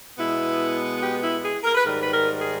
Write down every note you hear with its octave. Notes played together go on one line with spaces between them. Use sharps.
B2 G#3 B3 E4
G4
E4
G#4
A#4
B4
G#2 D#3 G3 A#4
B4
A#4
G#4